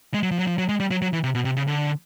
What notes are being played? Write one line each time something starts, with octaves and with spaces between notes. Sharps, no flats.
G#3
F#3
F3
F#3
F3
F#3
G#3
G3
F#3
F#3
E3
C3
B2
C3
C#3
D3